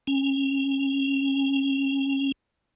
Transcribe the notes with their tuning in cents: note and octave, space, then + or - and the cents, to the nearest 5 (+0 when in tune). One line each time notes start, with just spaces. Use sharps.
C#4 -25